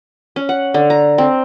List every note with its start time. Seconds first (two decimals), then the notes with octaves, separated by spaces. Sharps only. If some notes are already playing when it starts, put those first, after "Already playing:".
0.36 C#4
0.49 F#5
0.74 D3
0.90 A#5
1.18 C4